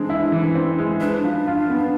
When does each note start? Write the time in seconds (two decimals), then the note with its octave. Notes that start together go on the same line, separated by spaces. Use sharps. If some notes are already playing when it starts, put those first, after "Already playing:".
Already playing: E3 G#3 C4 D4
0.10 E4
0.32 E3
0.55 C4
0.78 G#3
1.01 D4 B4
1.24 F3
1.47 F4
1.69 B3